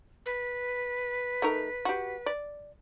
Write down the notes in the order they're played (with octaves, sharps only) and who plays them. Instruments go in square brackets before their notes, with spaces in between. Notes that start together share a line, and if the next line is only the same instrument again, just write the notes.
[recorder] B4
[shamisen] A3 D#4 A#4
F#4 G4
D5